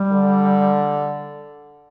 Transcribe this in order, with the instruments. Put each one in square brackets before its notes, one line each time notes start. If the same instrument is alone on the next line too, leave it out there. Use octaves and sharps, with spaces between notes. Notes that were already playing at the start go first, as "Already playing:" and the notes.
Already playing: [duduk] G3
[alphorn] D3